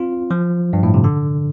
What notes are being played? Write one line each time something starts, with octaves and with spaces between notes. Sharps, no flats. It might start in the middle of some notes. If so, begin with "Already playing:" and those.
Already playing: C4 F4
F3
G2
A2
C3
D3